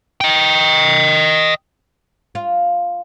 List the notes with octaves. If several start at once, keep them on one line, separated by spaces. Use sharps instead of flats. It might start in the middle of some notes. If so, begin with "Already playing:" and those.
D#5 G5
F4